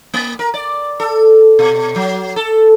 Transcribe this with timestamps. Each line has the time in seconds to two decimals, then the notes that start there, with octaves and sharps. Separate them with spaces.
0.14 A#3
0.39 A#4
0.54 D5
1.00 A4
1.59 B2
1.96 F#3
2.36 A4